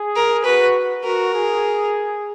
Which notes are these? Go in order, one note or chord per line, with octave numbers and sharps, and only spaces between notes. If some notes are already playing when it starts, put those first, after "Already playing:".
Already playing: G#4
A#4
F#4 B4
F#4 A#4
G#4